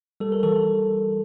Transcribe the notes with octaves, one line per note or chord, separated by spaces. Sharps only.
G3 A4
A#4
E3 A4